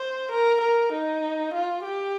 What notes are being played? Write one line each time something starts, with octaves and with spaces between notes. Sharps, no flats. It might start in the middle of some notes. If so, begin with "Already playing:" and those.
Already playing: C5
A#4
A#4
D#4
F4
G4